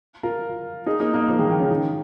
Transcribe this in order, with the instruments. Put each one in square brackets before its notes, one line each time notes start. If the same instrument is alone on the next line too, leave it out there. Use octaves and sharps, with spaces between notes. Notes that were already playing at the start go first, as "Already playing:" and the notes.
[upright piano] F4 A#4
D#4 G#4
A#3 D#4
A#3 D#4
F3 A#3
D#3 G#3
D#3
C#3
D#3